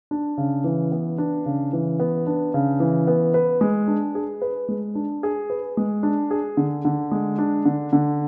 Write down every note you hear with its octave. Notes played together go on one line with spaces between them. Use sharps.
D4
C#3
E3
B3
D4
C#3
E3
B3
D4
C#3
E3
B3
B4
G#3
D4
G#4
B4
G#3
D4
G#4
B4
G#3
D4
G#4
D3
D3
G#3
D4
D3
D3